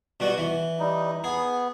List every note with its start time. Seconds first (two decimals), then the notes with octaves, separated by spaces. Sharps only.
0.20 B2 G3 F#4
0.38 E3
0.79 G3 D#4
1.24 B3 G#4